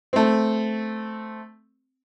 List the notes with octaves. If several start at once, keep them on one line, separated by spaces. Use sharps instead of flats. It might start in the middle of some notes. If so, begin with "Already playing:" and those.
A3 C4